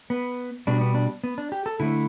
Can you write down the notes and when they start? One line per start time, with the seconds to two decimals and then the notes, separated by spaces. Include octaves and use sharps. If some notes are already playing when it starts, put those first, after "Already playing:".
0.10 B3
0.67 B2 G3 D4
0.81 B3
0.95 D4
1.24 B3
1.38 D4
1.52 G4
1.66 A4
1.80 D3 A3 E4